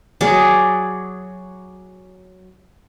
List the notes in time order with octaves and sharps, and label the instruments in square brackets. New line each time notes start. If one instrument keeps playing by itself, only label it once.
[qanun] F#3 G#4 D5